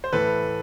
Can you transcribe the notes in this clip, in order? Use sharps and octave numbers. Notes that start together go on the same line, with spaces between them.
C5
A2 E3 A4 B4